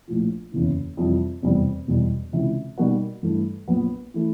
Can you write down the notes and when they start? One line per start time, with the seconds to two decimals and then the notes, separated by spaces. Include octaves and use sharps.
0.08 A#1 A2 F3
0.52 F#1 E2 C#3 E3
0.97 F2 C3 E3 G3
1.42 F1 E2 B2 G3
1.87 E1 E2 B2 G3
2.33 C#2 C3 E3
2.78 B2 G3 A#3 D#4 F#4
3.23 G2 E3 A3
3.68 A#1 A#2 F#3 B3
4.14 E3 A3